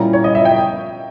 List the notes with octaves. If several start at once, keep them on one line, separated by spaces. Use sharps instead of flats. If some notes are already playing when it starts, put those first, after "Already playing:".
Already playing: A#2 G3 C#4 E4 A#5
C#5
D#5
E5
G5